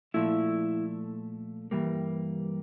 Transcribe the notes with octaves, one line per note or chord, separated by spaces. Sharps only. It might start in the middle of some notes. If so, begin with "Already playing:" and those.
A#2 F3 A3 E4
G2 E3 G3 A#3